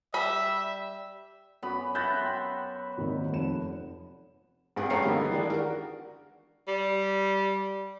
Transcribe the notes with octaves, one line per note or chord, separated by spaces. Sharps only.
G3 E5 B5
F#2 B3 F#4 B5
E5 F#5 B5 G6 A6 A#6
G5 C6
G#1 D#2 D#3
F1 E7
G#1 G2 G#4 F#5
G2 A3 C#4 A#5 C7 C#7
D3 G3 A#3 B3 D#4
D#3 E3 G#3 D4
F#4 A#4
G3